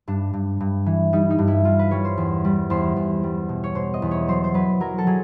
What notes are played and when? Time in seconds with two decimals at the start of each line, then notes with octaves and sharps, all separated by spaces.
0.08 G2 D4
0.33 G2
0.60 G2
0.86 E3
1.13 G3 D#4
1.30 D#4
1.39 G2
1.48 E4
1.65 G3 F4
1.79 B4
1.91 G3 C#5
2.05 C5
2.18 E2
2.45 G3
2.70 E2 C5
2.96 E2
3.24 G3
3.49 B2
3.64 C#5
3.75 B2 C5
3.94 D#5
4.02 E2
4.11 C#5
4.28 F#3 C5
4.44 C5
4.54 F#3 B4
4.80 F#3 A#4
4.98 A4
5.07 F#3 G#4